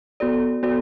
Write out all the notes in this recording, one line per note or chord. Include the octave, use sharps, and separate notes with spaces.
B3 F#4 A4 D5
B3 F#4 A4 D5